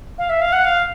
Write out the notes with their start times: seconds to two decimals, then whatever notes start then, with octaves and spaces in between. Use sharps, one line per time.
0.18 F5
0.30 E5
0.41 F5
0.53 F#5
0.65 F5